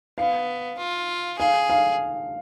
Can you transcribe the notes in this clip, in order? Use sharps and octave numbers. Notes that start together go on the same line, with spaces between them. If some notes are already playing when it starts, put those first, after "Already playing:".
B3 F5
F4
G#4 F5
F5